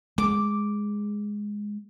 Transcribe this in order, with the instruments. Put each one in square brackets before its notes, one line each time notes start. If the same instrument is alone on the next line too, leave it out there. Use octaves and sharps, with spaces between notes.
[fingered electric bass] G#3 [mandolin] D6